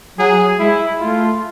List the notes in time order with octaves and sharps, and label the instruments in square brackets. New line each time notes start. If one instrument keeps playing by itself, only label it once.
[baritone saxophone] F#3 [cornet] G#4
[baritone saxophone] G#3 [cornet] E4
[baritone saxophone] A3 [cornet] F4